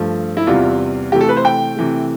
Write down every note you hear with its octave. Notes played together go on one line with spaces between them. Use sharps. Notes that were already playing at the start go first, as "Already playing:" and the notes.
Already playing: G2 F3 A3
E4
E2 C3 G3 F4
C3 E3 A3 G4
A4
B4
C5
G5
C3 E3 A3